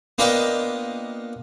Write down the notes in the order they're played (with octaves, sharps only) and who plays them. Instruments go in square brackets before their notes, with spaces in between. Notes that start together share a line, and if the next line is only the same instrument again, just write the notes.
[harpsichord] A#3 B3 D4 F4 D#5 G5